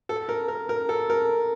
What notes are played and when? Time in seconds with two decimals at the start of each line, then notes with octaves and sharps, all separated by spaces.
0.09 A4
0.29 A#4
0.48 A#4
0.69 A#4
0.89 A4
1.10 A#4